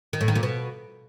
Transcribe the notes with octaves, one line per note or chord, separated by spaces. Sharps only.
D#3
A2
D#3
A#2
B2